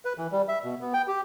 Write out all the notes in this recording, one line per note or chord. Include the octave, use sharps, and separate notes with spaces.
B4
E3
G3
E5
B2
B3
G5
G4